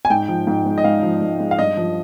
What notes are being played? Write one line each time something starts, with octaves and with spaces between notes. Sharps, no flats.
G#5
G#2 G5
F3
G#2
G#3
D#5
G#2 F5
F3
G#2
G#3
F5
G2 D#5
F3